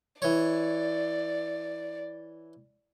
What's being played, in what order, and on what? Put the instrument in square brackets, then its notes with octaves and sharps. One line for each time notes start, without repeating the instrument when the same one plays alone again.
[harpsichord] E3 C#5 [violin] D5